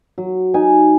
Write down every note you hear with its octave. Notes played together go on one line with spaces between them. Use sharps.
F#3
D#4 G#5